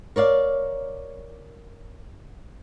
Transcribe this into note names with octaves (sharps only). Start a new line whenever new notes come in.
A#4 C#5 D5 F5